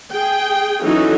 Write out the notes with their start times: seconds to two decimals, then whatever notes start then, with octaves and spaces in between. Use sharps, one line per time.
0.12 G#4 G5
0.81 E3 F#3 C#4 D#4 F#4 A4